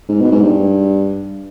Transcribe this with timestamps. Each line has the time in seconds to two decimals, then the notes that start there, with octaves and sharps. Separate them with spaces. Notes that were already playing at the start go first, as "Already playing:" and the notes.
0.09 G#2
0.21 B2
0.32 G#2
0.41 G2